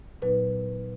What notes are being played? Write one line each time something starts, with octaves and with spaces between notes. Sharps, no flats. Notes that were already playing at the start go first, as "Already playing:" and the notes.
A#2 F#3 B3 D#4 B4